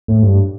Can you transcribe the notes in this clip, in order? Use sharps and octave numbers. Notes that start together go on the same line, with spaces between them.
A2
G2